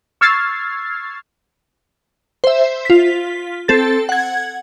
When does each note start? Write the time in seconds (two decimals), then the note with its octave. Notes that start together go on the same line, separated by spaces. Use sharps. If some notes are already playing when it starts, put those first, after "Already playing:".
0.21 C#6 E6 F6 G#6 A6 C7
2.44 C5 E5
2.85 F4 B6
3.68 C4 A4 A6
4.09 F#5 G#6